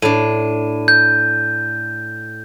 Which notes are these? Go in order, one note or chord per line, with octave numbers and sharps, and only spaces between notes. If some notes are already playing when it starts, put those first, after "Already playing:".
A2 D4 D#7
G6